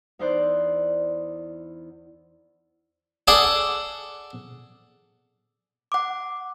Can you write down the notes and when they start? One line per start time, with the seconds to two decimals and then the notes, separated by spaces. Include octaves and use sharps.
0.19 E2 D#4 E4 C5 D5 F#6
3.28 G#4 A4 D5 F#5
5.92 F#5 D6